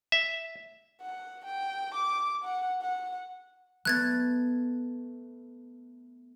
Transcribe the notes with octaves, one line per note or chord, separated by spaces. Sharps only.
E5
F#5
G5
D6
F#5
F#5
A3 B3 F#6 G#6 A6